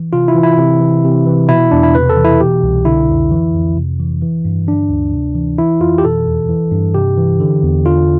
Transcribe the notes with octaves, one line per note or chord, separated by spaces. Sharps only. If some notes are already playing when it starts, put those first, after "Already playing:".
Already playing: E3
C3 F4
E4
E3
E4
C3
E3
C3
E3
B2 E4
E2 D4
E4
C3 B4
A4
E3
E4
B2 G4
C2
D3 E4
F2
E3
F2
C3
E3
E3
G2
D3 D4
D2
C3
E3
E3 E4
F2 F4
G4
B2 A4
E2
E3
G2
C3 G4
E3
D3
E2
D3 F4